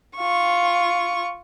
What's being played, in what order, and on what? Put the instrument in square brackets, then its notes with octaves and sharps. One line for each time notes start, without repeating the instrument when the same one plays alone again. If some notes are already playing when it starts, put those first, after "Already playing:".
[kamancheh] F4 C#6